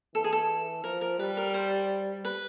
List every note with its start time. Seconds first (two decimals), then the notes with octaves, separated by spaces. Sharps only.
0.14 E3 A4
0.24 G#4
0.33 A4
0.84 F3 A#4
1.01 A#4
1.19 G3 B4
1.37 A#4
1.54 C5
2.25 B4